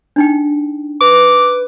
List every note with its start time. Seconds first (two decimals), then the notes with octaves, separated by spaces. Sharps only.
0.16 D4 D#4 G5
1.01 B4 D6